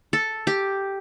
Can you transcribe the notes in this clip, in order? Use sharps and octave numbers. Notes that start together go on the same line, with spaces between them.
A4
G4